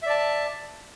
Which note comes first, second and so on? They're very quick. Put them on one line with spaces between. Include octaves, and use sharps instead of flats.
E5 D5 A5